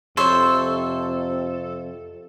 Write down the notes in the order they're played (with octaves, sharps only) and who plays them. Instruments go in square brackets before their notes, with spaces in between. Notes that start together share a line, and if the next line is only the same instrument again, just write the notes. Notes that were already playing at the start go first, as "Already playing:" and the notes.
[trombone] F2 [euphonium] C3 [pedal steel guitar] A4 [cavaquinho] C5 C#5 E5